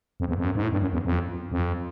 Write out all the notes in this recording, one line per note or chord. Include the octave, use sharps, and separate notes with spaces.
F2
E2
F2
F#2
G#2
A2
G2
F#2
E2
F2
F2